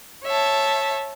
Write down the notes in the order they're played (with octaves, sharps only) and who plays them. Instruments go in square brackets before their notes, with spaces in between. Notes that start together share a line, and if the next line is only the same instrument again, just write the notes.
[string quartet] C#5 E5 A5